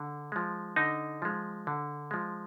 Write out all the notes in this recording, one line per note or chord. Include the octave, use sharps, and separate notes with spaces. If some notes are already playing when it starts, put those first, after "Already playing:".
Already playing: D3
F3 G#3
D3 D#4
F3 G#3
D3
F3 G#3